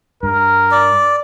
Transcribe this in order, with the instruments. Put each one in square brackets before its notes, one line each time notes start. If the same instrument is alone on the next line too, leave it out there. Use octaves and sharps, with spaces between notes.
[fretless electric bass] G2 [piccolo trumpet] A#4
[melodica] D5